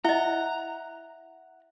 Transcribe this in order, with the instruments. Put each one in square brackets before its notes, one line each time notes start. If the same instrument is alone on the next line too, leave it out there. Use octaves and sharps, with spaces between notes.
[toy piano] E4 D#5 [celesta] E5 G7 [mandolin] F#5 [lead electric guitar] A#5